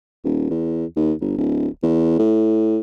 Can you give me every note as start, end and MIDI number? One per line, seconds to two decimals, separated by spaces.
0.24 0.49 27
0.51 0.85 40
0.96 1.13 39
1.21 1.33 31
1.38 1.68 26
1.83 2.17 40
2.19 2.79 45